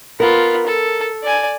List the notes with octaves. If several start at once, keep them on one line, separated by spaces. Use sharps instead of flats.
B3 F4 A#4
A4
D5 G#5